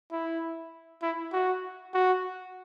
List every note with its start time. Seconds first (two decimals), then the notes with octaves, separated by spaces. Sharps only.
0.12 E4
1.03 E4
1.33 F#4
1.94 F#4